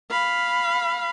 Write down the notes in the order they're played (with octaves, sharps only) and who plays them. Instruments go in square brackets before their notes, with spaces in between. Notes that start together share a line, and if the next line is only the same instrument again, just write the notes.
[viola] F5 B5